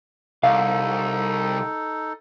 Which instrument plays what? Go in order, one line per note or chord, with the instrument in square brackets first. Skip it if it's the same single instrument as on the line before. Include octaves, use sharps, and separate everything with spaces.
[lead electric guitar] C2 [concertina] D#4 A4 [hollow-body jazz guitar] F5